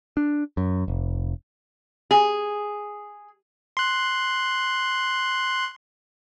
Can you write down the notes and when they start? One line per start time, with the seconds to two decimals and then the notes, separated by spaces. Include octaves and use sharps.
0.17 D4
0.57 F#2
0.88 F1
2.11 G#4
3.77 C6 F#6